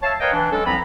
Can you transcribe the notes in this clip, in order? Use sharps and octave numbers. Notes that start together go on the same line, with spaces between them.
C#5 E5 F5 A5
A#4 B4 C#5 D#5 F5 G5
E3 D4
F#3 G#3 C#4 D4 A4
C2 F3 C4 B4 A#5 B5